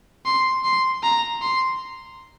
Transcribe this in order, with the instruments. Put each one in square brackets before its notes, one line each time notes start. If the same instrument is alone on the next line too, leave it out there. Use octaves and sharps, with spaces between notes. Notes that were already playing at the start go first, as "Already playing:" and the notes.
[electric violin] C6
C6
A#5
C6